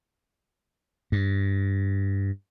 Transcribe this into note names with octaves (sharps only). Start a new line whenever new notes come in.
G2